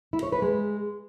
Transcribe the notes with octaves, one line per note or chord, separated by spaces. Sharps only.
E4
C#5
B4
G#3